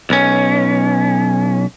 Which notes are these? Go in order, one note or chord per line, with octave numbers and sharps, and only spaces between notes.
B1 C#4